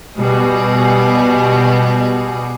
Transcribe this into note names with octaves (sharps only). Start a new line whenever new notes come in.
B2 G3 G#4